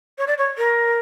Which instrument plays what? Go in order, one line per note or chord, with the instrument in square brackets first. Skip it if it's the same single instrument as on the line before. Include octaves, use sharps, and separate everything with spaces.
[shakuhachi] C#5
D5
C#5
A#4